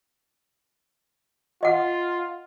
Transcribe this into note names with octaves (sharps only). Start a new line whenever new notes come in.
F4 D#5 F#5